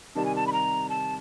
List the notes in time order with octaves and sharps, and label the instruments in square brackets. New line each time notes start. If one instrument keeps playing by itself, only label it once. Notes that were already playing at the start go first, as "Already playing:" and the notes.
[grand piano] C3 D#3 G3 [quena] A5
[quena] G#5
A5
B5
A#5
A5